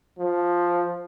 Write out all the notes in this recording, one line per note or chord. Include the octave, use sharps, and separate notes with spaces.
F3